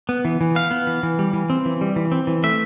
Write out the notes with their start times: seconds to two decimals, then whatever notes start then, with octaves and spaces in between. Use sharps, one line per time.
0.09 B3
0.25 E3
0.41 E3
0.55 B3 F5
0.71 B3
0.87 E3
1.03 E3
1.19 G3
1.33 E3
1.50 C4
1.66 E3
1.81 G3
1.96 E3
2.12 C4
2.27 E3
2.43 A3 E5